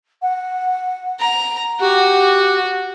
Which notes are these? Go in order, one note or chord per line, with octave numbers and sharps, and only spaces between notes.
F#5
A#5
F#4 G4